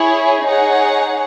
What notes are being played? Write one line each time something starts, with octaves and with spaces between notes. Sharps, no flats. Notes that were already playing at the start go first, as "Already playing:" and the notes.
Already playing: E4 G#4 C#5
D#4 G#4 C#5 F#5